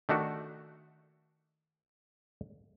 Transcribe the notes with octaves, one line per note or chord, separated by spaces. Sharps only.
D#3 A3 D4 F#4